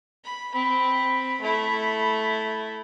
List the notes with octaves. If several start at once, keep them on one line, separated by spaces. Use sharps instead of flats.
B5
C4 B5
A3 E4